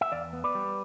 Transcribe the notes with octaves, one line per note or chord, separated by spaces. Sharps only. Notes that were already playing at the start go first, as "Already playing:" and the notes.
E5
E2 D5 F5
B3
B4 D5
G3